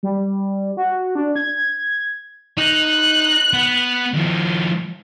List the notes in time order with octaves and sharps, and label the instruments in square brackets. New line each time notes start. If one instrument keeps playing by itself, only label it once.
[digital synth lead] G3
F#4
D4
G#6
[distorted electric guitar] D#4 [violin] F#6
[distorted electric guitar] B3
D#3 F3